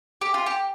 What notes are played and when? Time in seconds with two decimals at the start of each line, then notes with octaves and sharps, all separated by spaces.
0.21 G4
0.34 F4
0.46 G4